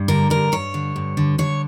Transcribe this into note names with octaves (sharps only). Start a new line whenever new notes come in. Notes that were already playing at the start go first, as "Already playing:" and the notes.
Already playing: G2
D3 A#4
G2 A#4
G2 C#5
D3
G2
D3
D3 C#5